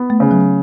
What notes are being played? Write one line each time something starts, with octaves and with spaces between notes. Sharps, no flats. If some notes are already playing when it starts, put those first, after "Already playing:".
Already playing: B3
A3
C#3
F#3